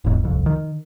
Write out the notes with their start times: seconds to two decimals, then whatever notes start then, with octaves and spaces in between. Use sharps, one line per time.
0.04 D#1 G#1 E2 G#2
0.23 D#1 C2 F2
0.46 D#3